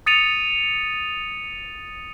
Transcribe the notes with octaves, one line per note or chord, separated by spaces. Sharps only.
D#6 A6 C#7 D#7 F7